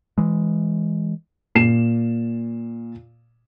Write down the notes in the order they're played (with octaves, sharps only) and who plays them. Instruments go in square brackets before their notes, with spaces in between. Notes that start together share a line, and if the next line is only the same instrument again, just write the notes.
[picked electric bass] E3 G#3
[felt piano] A#2 C7 E7